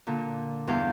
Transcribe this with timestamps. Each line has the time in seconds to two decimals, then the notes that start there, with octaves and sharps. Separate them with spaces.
0.07 A#2 D3
0.67 E2 G2 B3 F5 D6 G6